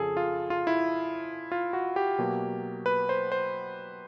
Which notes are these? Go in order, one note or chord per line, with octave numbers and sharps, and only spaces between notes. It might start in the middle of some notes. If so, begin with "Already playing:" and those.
Already playing: F2 C#3 F3 G#4 A4
F4
F4
E4
F4
F#4
G4
B2 F#3 A#3
B4
C5
C5